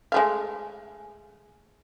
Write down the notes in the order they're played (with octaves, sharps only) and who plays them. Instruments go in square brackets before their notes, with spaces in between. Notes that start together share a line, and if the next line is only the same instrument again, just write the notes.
[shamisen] G#3 A3 F5